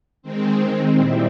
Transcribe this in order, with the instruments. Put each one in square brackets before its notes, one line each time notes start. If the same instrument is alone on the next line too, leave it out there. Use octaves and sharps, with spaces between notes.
[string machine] D#3 G#3 C4
A#2 G3 C4 E4